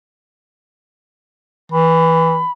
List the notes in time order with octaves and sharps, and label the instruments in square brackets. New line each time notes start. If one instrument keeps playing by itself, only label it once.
[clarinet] E3 [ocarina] B5